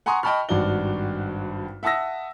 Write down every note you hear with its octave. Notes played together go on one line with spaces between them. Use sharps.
F#5 G#5 A#5 C6 C#6 D#6
D#5 G5 A5 B5 C#6 F6
G#1 G2 F#4 D5 G7
E5 F#5 A5 D#6 E6 A#6